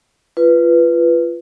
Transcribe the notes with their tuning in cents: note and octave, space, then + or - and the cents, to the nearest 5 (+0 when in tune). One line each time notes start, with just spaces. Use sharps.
F4 -20 B4 +0